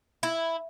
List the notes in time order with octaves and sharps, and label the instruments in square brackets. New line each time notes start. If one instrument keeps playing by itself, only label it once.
[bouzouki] E4